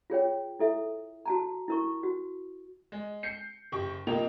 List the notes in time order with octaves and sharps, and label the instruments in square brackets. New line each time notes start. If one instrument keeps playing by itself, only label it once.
[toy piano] F4 G#4 C#5 G5
E4 A4 E5
F#4 A5 A#5
E4 A#4 C#6
F#4
[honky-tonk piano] G#3
G6 C7 C#7
F#1 G4 C#6
C2 F3 A#3 D#4 G5 F7